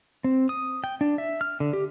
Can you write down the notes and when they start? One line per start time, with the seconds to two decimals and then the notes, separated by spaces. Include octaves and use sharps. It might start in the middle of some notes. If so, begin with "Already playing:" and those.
0.24 C4
0.49 D#6
0.84 G5
1.01 D4
1.18 E5
1.41 F6
1.60 D3
1.73 G4